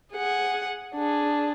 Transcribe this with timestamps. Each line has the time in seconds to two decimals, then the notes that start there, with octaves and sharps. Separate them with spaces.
0.13 G#4 F#5
0.95 D4 G#4